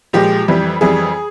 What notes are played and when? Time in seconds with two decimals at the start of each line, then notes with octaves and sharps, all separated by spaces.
0.13 A#2 F3 G#3 G4
0.48 F2 E3 G3
0.81 F2 E3 G3 G#4